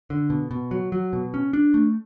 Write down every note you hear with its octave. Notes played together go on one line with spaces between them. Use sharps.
D3
B2
B2
F#3
F#3
B2
C#4
D4
A3